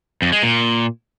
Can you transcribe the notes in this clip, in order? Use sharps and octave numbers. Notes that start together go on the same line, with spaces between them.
F2
G#3
A#2